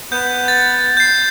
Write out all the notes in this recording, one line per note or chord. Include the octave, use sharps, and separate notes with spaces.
B3 G6
A6
G6 C7